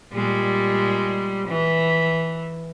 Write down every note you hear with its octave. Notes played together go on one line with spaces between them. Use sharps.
A#2 G3 G#3
E3